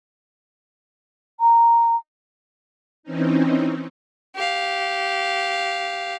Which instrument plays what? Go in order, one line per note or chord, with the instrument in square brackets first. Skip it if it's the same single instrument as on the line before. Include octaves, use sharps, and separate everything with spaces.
[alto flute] A#5
[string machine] E3 C4 C#4 D#4
[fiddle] G4 F5